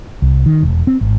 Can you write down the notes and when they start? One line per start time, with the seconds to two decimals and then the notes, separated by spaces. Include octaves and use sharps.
0.22 C2
0.46 D#3
0.63 E1
0.87 C4
1.01 G#1